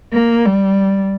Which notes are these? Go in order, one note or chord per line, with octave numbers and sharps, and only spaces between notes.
A#3
G3